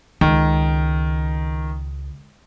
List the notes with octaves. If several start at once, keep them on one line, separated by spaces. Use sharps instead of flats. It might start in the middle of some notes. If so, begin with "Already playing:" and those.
C#2 D#3